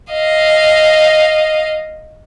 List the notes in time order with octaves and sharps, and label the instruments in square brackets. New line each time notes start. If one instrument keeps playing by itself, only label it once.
[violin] D#5 F5